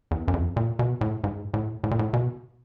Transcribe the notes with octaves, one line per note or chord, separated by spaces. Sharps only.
E2
F#2
F2
A#2
B2
A2
G#2
A2
A2
A#2
A2
B2